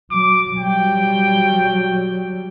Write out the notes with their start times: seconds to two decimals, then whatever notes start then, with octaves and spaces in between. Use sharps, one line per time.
0.11 F#3 D6
0.58 F#3 G3 G5